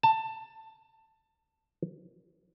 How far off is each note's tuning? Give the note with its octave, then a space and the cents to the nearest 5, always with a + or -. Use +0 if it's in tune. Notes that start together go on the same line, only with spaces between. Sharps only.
A5 +15